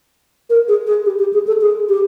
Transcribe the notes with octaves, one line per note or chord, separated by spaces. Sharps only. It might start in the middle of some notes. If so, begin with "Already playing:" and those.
A#4
G#4
G#4
G4
G4
G#4
A4
G#4
G4